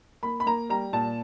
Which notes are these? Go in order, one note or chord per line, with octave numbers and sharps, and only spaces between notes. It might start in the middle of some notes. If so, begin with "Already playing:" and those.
A#3 B5
B5
A#3 A#5
G3 A#5
A#2 A5